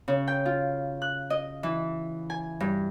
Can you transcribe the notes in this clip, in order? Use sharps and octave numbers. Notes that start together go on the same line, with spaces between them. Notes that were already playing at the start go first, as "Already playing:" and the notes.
C#3
G5
F4
F#6
D#5
E3
G#5
G2